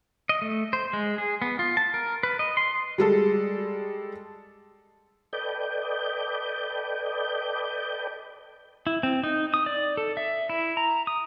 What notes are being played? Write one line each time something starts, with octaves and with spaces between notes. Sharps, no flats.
D#5
A3
C5
G#3
G#4
B3
F4
A5
A#4
B4
D#5
C6
G3 G#3 A4
A4 B4 D5 D#5 G5 G6
E4
C4
D#4
D#6
D5
A4
E5
E4
A#5
D#6